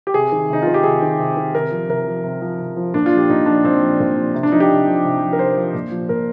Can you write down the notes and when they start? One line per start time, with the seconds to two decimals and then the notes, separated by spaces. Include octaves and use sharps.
0.07 G4
0.14 C3 G#4
0.32 D#3
0.50 C3 D#4
0.62 D#3 F4
0.74 G4
0.83 C3 G#4
1.02 D#3
1.19 C3
1.37 D#3
1.54 C3 A#4
1.71 F3
1.89 C3 A#4
2.06 F3
2.24 C3
2.41 F3
2.59 C3
2.76 F3
2.94 A#2 D4
3.06 F4
3.11 F3
3.17 G4
3.30 A#2 D#4
3.46 F3 D4
3.64 A#2 C4
3.81 F3
4.00 A#2
4.16 F3
4.35 C3
4.43 D4
4.52 F3 D#4
4.60 G4
4.70 C3
4.87 F3
5.05 C3
5.21 F3
5.33 A#4
5.39 C3 C5
5.57 F3
5.74 A#2
5.91 F3
6.09 A#2 A#4